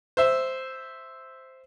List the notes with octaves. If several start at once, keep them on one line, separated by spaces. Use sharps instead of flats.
C5 E5